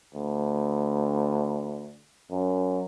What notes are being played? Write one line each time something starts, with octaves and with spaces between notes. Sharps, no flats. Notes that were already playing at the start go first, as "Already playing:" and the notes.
D2
F#2